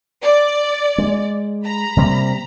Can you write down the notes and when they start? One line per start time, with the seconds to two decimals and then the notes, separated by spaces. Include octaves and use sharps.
0.21 D5
0.98 G#3
1.64 A#5 B5
1.97 C3 G3 A#3